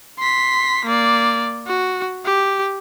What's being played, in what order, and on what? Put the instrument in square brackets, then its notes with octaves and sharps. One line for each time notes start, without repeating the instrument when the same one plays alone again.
[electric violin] C6 B6
A#3 D5
F#4
G4